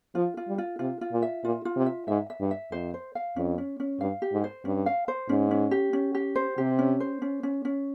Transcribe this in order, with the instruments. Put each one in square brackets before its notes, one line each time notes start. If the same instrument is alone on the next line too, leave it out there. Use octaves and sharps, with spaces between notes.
[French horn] F3 [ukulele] F4
[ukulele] F4
[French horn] G3
[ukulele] F4
[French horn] C3 [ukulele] F4
[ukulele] F4
[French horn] A#2
[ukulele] E5
[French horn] A#2 [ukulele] F4
[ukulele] F4
[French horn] C3
[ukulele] E5
[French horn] G#2 [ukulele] E5
[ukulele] E5
[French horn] G2
[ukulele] E5
[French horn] F2 [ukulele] C5
[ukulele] C5
F5
[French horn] F2 [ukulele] C#4
[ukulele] C#4
C#4
[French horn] G2 [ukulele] F5
[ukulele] G4
[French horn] G#2
[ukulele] C5
[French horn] G2 [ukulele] C#4
[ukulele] F5
C5
[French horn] G#2 [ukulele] C#4
[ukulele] C#4
G4
C#4
G4
C5
[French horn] C3 [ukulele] G4
[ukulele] C#4
C5
C#4
C#4
C#4